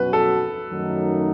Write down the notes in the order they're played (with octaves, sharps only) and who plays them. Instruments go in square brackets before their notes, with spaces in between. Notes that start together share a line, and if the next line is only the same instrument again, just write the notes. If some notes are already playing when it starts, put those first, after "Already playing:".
Already playing: [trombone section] B2 F#3 C#4 F#4 [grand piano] B4
[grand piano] A4
[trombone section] F#2 D#3 F#3 A3 D#4